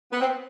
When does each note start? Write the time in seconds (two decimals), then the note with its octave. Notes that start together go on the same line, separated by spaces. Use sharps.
0.12 B3
0.20 C4